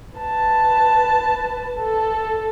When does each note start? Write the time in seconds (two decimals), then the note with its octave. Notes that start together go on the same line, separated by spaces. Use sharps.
0.17 B4 A5
1.76 A4